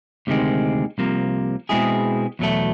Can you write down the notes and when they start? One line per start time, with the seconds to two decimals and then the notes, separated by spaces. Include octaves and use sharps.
0.27 D2 C3 D#3 G#3 C4
0.98 C2 C3 F3 A#3
1.69 B2 G#3 C4 E4 G#4
2.39 E2 B2 F#3 A3